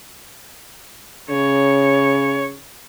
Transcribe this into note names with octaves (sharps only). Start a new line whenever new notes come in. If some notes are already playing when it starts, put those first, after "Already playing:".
C#3 C#5